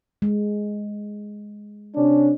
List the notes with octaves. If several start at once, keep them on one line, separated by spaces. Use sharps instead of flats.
G#3
C3 C#4 D4